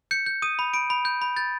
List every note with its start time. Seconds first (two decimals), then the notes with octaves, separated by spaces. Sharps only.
0.11 G6 C#7
0.26 G6
0.42 D#6 D#7
0.59 B5
0.74 B5 D7
0.90 B5
1.05 G6
1.22 B5
1.36 G6 A6